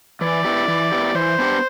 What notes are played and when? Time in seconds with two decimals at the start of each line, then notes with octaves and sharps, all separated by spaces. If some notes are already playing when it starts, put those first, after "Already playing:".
0.21 E3 D5
0.45 B3 E4 G4
0.68 E3
0.92 B3 E4 G4
1.15 E3 C5
1.39 B3 D4 G4